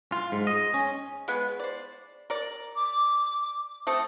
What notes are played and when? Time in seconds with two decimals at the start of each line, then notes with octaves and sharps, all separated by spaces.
0.12 F4
0.32 G#2
0.47 D#5
0.74 C#4
1.28 G#3 B3
1.60 C5 D5
2.30 A#4 D5
2.76 D6
3.87 A3 C4 A4 D#6